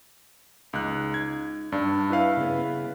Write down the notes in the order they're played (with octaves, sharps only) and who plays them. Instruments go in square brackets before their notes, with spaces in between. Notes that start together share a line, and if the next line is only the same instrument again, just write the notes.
[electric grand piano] C#2 F#6 [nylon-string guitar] D#4
[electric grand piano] G#6
[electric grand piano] G2 [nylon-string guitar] D4
[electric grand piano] E4 B4 F5
[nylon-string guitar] C#3 B3